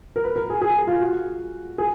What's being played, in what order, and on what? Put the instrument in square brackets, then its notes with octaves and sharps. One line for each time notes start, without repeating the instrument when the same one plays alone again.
[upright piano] A#4
B4
A#4
G#4
G#4
F4
F#4
G#4